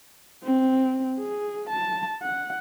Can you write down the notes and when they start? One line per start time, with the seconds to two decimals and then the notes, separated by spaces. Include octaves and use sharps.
0.43 C4
1.18 G#4
1.70 A5
2.22 F#5